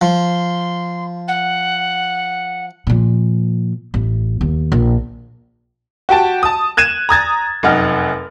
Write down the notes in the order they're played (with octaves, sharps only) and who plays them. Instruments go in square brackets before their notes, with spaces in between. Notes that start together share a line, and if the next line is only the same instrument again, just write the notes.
[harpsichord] F3 [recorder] C6
[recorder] F#5
[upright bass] A#2 F3
A1
D#2
A#1
[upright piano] F#4 G4 G5 A5
A5 D#6
F#6 G#6 D#7 E7
A#5 D#6 G#6 A6
F1 F#2 D#4 F#5 F6